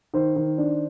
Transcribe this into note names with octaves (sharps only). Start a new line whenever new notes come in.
D#3 C5
D#3
D4